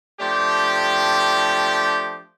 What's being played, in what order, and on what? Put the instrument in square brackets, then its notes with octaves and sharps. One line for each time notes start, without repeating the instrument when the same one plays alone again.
[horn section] F3 A3 D4 G4